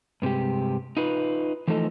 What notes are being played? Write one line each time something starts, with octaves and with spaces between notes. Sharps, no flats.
G2 C3 G#3 G4
D#4 F4 B4
E3 F3 A3 D#4 A4 D#5